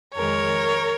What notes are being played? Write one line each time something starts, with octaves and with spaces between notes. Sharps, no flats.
F2 D#3 G#3 A#4 C#5